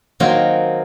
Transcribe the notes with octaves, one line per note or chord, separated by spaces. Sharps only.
D#3 F#3 A#3 C4 F4 F#4